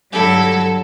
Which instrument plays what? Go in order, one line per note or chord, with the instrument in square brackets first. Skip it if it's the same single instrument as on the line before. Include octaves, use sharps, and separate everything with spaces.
[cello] G2 F#3 [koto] D3 E4 G4 [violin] A4